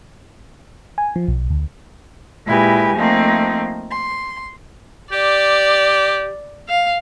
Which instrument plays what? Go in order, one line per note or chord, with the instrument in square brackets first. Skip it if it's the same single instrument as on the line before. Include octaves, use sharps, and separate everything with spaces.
[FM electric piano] G#5
F3
B1
D2
[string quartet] A#2 G#3 E4 G4 B4 G#5
F3 A3 A#3 C4 D#4
C6
[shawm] G4 [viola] D5
[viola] F5